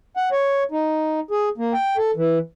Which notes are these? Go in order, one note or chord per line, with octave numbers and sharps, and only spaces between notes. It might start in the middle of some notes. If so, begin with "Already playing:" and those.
F#5
C#5
D#4
G#4
A#3
G5
A4
E3